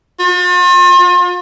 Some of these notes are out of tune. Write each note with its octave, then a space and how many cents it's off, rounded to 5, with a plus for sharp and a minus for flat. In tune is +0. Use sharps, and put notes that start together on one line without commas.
F4 +40